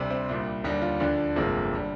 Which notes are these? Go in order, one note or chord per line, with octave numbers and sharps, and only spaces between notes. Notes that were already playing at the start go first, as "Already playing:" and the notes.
Already playing: D2 C3 G3
C4
C2 A#2 G3 D4
D#2 D3 G3 D#4
F4
D2 D3 F3 D4
G1 F2 C3 F3 G#3 A#3
D3 G3